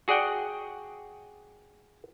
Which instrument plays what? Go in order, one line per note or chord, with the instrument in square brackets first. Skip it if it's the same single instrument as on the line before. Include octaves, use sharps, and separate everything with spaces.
[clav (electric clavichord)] F#4 G#4 D5 F#5 G5